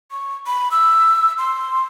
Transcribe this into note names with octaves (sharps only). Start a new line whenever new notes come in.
C#6
B5
E6
C6